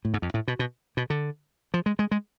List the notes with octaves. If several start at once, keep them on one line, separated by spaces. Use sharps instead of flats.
A2
G#2
F2
A2
B2
B2
B2
D3
F3
G#3
G#3
G#3